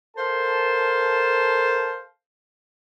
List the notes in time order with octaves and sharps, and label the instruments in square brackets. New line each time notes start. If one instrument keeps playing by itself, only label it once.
[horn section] A4 A#4 C5 F5 A5